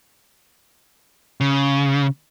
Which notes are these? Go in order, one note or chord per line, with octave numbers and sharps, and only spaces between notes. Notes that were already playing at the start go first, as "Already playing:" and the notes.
C#3